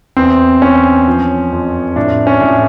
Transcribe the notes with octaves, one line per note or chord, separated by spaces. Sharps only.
E2 C4
E2 C#4
F3
F2
A2 D4
C#4
A2